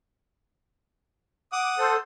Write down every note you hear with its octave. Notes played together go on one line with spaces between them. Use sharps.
F#5 D6 D#6
A4 C5